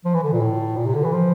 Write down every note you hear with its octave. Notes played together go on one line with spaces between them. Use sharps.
F3
E3
D3
A#2
A2
A#2
C3
D3
E3
F3